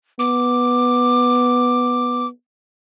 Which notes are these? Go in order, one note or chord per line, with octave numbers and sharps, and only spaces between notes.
B3 D6